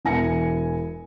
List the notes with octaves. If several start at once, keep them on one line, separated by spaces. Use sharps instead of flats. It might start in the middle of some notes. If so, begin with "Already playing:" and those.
E1 E3 G#5 A#6 C#7